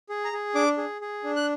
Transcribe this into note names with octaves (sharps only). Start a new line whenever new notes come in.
G#4
A#5
G#4
D4 D6
G#4
G#4
D4
F#6